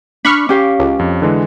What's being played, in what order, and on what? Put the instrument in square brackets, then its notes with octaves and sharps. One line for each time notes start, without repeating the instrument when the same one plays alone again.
[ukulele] D4 [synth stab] B5 C#6 F6
[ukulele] C#4 G4 F5 [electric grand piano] D6
[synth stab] C#2
[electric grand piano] F2
D3 E3 G#3